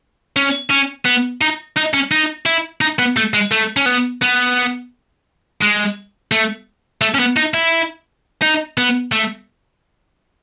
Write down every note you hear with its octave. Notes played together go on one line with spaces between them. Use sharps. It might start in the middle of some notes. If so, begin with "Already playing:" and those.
C#4
C#4
B3
D#4
D#4
C#4
D#4
E4
D#4
B3
A3
G#3
A3
C#4
B3
B3
G#3
A3
A3
C#4
B3
D#4
E4
D#4
B3
A3